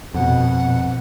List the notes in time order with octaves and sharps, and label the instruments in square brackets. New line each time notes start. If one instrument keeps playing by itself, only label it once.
[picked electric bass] F2 [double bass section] B2 [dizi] F#5